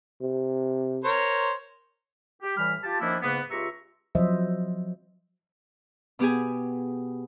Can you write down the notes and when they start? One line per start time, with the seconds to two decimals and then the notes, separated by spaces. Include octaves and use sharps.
0.21 C3
1.04 A#4 C5 C#5
2.43 G4
2.57 A2 E3 G3 B5 F6
2.84 F4 G4 A5
3.01 D#3 F3 A#3 C#4 D4 E4
3.22 G#2 C#3 A#3 B3
3.51 C#2 F4 G4 E5 A#5 C#6
4.15 F3 F#3 C5 D#5 E5
6.19 B2 B3 G4 G#4 G#5